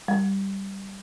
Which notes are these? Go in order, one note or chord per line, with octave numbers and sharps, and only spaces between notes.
G3